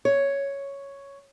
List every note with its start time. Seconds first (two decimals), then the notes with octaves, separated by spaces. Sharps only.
0.05 C#5